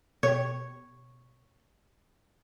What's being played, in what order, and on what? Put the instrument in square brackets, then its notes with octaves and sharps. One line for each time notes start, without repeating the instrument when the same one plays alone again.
[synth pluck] B2 G4 [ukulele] C#5